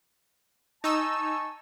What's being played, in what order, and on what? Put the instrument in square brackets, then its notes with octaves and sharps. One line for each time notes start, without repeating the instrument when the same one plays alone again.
[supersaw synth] D#4 E6 [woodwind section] G#5 A5 C#6